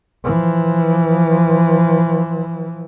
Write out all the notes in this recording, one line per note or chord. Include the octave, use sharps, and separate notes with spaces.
E3 F3